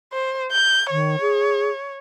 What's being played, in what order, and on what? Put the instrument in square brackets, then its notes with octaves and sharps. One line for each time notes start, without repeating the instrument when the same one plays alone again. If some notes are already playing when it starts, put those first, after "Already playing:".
[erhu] C5
G6
[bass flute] D#3 [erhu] C#5
[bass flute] G#4